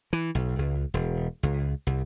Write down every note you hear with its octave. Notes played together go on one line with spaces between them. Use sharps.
E3
B1
C#2
E1
C#2
C2